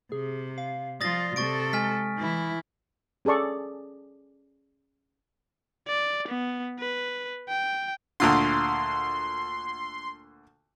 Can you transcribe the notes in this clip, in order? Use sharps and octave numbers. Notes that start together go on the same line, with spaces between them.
C3 G#4
F5
F3 F4 D5 D#6 A6 A#6
C3 A4 C#6 A6 D7
G#3 G#5 F6 B6
E3 E4
C#4 G#4 A4 D5 C#6
D5
B3
B4
G5
D2 A#2 D3 C6